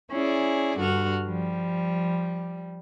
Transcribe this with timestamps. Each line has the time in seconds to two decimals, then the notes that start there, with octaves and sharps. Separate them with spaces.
0.11 C#4 E4 G#4 D5
0.79 G2 D3 F#4 F6
1.25 F3 G3